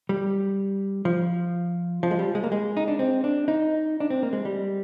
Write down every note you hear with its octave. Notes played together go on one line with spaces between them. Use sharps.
G3
F3
F3
G#3
G3
G#3
A#3
G#3
D#4
D4
C4
D4
D#4
D4
C4
A#3
G#3
G3